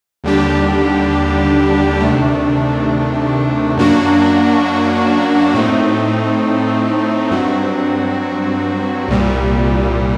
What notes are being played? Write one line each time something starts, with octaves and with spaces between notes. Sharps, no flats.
D#2 D3 G3 D4 G4
D2 C3 D#3 A3 D4
F#2 F#3 A#3 D4 F#4
A2 A3 C4 D#4
G2 F#3 C4 F#4
C2 A#2 G3